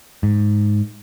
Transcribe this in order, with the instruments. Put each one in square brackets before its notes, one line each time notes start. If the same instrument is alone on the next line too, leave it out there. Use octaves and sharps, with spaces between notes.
[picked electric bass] G#2